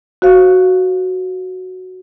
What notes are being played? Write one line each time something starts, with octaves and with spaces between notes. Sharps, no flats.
F#4 C5 F5